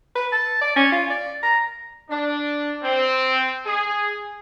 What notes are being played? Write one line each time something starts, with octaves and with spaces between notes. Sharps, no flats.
B4
A5
D5
C#4
F4
D5
A#5
D4
C4
G#4